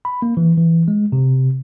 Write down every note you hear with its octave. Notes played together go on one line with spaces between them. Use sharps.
B5
A#3
E3
E3
G#3
C3